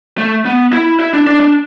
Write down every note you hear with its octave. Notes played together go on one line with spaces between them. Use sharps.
A3
B3
E4
E4
D4
D4
D4